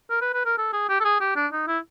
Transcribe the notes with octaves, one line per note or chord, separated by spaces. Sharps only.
A#4
B4
B4
A#4
A4
G#4
G4
A4
G#4
G4
D4
D#4
E4